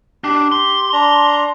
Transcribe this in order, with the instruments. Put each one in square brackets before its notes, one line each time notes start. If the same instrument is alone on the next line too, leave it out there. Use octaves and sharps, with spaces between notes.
[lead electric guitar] D4 [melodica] G4
[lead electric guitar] C6
[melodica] D4 A#5